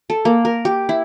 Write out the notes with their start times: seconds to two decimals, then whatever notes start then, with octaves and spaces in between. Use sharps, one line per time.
0.10 A4
0.25 A#3
0.45 A#4
0.65 G4
0.89 E4